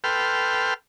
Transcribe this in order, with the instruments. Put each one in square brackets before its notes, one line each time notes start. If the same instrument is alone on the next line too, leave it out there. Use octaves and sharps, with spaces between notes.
[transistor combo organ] A4 B4 G5 C6 F6